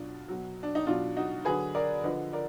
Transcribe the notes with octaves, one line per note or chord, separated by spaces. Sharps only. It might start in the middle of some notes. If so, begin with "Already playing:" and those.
Already playing: B2 F#3 D4 F4
B2 F#3
D4
D#4
B2 F#3 D4 F4
D#4 F#4
D3 F#3 G#4 B4
A#4 D5
D3 F3 B4 D#5
A#4 D5